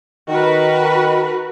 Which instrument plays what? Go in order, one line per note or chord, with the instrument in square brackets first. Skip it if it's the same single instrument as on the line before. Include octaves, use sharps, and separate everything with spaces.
[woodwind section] D#3 [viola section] F#4 A#4 B4